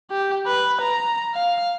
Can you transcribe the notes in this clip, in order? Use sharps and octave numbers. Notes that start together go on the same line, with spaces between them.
G4
B4
A#5
F5